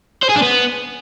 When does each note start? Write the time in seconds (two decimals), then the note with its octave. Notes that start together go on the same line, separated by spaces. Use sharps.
0.23 C5
0.29 G#4
0.36 D4
0.42 B3